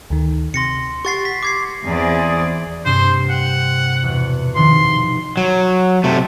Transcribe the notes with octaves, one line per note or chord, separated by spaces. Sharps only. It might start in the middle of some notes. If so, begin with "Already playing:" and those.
D2 D#3
C3 C6 A#6 C#7
G4 F#5 C6 C#6 A6 C7
B6
D6 G#6 C7
E2 C4 G#4 D5
G2 C3 C5
F#5 G5
E2 B2
F1 D#3 C6
F#3
C3 A3